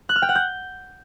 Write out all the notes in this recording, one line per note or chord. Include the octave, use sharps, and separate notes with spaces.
F#6
F6
G5
F#5
G6